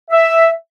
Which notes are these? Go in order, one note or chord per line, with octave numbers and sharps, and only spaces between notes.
E5